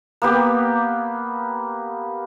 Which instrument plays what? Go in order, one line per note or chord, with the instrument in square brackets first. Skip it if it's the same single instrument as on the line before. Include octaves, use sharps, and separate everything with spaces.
[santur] A#3 B3 G4